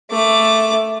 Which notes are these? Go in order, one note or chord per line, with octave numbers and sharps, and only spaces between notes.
A3 D6